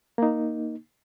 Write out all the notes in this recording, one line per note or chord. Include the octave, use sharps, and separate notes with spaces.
A#3 D#4